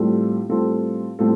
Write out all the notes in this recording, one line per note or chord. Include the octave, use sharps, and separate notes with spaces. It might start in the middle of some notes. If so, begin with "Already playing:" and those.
Already playing: A2 G3 C4 F4 A4
A2 G3 C4 F4 A4
A2 G3 C4 F4 A4